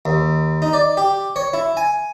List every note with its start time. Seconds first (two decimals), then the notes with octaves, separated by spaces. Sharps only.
0.05 D#2
0.62 D#4
0.73 D5
0.97 G4
1.36 C#5
1.54 E4
1.77 G#5